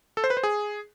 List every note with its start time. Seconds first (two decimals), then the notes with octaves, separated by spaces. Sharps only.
0.17 A4
0.24 C5
0.30 B4
0.37 C5
0.43 G#4